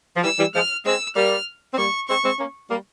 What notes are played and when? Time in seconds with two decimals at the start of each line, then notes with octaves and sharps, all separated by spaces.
0.16 F3
0.24 E3 G3 E6
0.39 E3 G3
0.55 F3 G#3 F6
0.86 G#3 C4 E6
1.16 G3 A#3 F6
1.74 C4
1.78 G3 A#3 C#6
2.09 G#3 C4 C#6
2.24 G#3 C4
2.39 A#3 C#4
2.70 G3 A#3